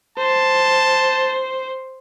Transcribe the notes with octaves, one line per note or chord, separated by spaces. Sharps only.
C5 A5